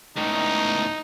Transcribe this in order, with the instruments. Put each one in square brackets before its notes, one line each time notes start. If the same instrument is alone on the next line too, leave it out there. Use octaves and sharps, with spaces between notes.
[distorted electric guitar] C#2 A2 [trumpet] D#4